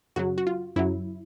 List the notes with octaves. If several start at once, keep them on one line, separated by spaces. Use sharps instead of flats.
F#2 C#3 F#3 F#4
F#4
F4
F#2 C#3 F#3 E4